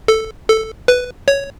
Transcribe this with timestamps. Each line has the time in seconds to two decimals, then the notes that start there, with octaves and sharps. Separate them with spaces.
0.08 A4
0.48 A4
0.88 B4
1.28 C#5